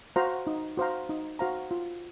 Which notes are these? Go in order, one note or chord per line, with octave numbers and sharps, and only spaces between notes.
F#4 C5 F5 A#5
D#4
F#4 C5 F5 A#5
D#4
F#4 C5 F5 A#5
F4